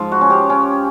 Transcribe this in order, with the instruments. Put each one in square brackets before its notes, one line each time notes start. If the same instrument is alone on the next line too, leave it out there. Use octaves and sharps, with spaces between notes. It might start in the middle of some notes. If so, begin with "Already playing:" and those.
Already playing: [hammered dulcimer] G#2 F3
F#4
C#4
G4
C#4